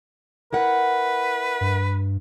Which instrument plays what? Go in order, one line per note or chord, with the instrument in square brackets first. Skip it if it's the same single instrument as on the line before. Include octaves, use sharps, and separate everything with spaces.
[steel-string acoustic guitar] E4 A#4 F#5 [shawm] B4
[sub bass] G2